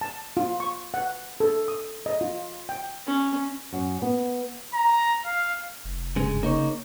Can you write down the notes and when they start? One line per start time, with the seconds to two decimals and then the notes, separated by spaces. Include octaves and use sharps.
0.01 A5
0.37 F4
0.60 C#6
0.94 F#5
1.40 A4
1.68 D#6
2.06 D#5
2.21 F4
2.69 G5
3.07 C#4
3.73 F#2
4.02 B3
4.74 A#5
5.25 F5
5.84 F1
6.16 G2 C#3 G#3
6.43 C#3 A#3 D#4 C#5